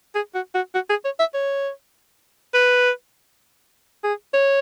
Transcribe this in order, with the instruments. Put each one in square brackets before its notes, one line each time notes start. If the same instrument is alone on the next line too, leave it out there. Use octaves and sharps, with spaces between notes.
[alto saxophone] G#4
F#4
F#4
F#4
G#4
C#5
E5
C#5
B4
G#4
C#5